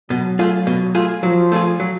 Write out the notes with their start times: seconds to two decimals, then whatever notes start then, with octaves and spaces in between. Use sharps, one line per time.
0.10 B2 F#3
0.39 A3 F4 G#4
0.67 B2
0.95 A3 F4 G#4
1.23 F3 F#3
1.52 A3 F4 G#4
1.80 F#3